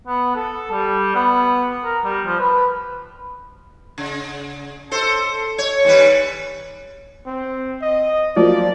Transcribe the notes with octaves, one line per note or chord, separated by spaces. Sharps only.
B3
A4
G3
B3
A#4
G3
F3
B4
C#3
A4 C5
C#5
D#2 G3 B4
C4
D#5
F3 F#3 A#3 D5